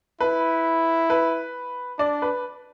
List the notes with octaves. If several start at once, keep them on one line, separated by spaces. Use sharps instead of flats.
E4 B4
B4
D4 D5
B4